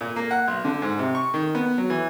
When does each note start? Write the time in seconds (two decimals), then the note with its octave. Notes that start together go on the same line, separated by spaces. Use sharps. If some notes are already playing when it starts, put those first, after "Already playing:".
0.01 A#2
0.16 A#3
0.31 F#5
0.48 B1
0.65 D3
0.82 G#2
0.99 C3
1.15 C#6
1.34 D#3
1.55 B3
1.78 F#3
1.90 E3